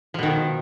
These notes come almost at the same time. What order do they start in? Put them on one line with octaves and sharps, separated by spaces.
F3 B2 D#3